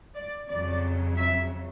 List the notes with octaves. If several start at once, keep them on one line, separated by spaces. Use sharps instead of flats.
D5
F2 C#3 F#3 D5
E5